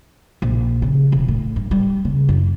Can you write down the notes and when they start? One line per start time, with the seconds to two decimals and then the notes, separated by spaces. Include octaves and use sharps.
0.42 A#1
0.82 C#3
1.12 E1
1.28 A2
1.56 G2
1.71 G3
2.05 C#3
2.29 F#2